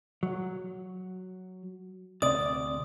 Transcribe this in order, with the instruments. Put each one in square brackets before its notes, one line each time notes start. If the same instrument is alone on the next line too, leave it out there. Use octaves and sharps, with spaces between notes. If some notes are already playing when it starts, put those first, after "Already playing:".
[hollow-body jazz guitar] F#3
[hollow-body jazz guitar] D2 C3 D5 [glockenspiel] D#6